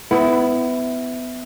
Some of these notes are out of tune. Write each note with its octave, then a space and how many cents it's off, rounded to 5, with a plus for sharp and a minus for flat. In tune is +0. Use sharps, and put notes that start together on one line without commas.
B3 +25 E4 -5